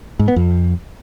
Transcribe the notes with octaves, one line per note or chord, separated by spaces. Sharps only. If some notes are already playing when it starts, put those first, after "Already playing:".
G#2
B3
F2